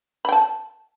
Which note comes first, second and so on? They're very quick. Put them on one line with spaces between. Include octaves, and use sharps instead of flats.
B5 G5 A5